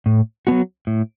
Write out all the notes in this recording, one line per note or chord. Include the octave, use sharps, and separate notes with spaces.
A2
F#3 B3 F#4
A2